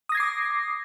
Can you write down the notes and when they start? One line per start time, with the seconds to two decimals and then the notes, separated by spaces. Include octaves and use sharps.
0.09 D#6
0.12 A#6
0.15 G#6
0.17 C7
0.20 D6